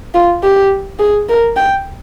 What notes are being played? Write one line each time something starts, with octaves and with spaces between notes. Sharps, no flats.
F4
G4
G#4
A#4
G5